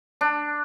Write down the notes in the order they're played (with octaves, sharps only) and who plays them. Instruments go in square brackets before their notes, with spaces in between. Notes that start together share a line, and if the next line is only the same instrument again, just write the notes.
[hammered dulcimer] D4